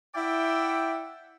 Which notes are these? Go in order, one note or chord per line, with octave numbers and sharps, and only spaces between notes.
E4 D5 E5 F#5 G5